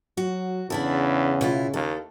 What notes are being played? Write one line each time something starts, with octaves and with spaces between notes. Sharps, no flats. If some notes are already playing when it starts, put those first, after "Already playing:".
F#3 F#4
E2 C#3 D4 E4 A4
B2 E4 F4
D#2 A4